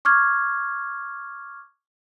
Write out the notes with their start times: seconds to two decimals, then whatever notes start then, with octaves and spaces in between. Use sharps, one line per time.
0.05 C#6 D6 F6 G#6